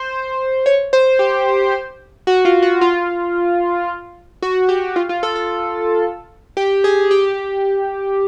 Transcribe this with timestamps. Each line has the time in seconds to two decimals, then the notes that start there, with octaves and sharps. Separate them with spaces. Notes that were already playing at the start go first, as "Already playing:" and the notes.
Already playing: C5
0.66 C#5
0.93 C5
1.19 G4
2.27 F#4
2.45 F4
2.62 F#4
2.81 F4
4.42 F#4
4.69 G4
4.96 F4
5.09 F4
5.23 A4
5.36 A4
6.57 G4
6.84 G#4
7.11 G4